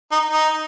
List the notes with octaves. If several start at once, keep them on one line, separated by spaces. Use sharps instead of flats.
D#4
D#4